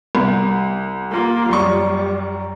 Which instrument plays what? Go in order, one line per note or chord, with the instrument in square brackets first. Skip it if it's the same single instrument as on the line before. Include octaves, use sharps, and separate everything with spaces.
[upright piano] C2
[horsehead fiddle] A#3 F4
[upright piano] F#2 D5 C#6 [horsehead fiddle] G3